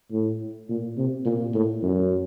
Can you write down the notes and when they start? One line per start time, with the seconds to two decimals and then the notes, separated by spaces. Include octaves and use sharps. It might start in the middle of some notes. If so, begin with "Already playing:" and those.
0.11 A2
0.69 A#2
0.97 C3
1.25 A#2
1.54 A2
1.82 F#2